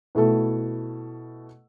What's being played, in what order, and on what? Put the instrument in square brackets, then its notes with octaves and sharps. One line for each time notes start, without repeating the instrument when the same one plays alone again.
[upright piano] B2 A3 E4 A4